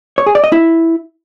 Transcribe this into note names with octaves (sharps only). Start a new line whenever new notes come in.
C#5
G#4
D5
D#5
E4